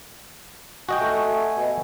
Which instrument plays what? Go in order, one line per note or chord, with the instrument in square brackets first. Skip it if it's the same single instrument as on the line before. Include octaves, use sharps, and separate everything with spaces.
[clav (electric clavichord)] F#4 D#5 G5 [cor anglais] G#5
[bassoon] A3
B2